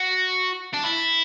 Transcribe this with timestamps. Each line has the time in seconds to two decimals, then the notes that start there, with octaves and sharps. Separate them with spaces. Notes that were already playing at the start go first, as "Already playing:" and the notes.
Already playing: F#4
0.74 D4
0.84 E4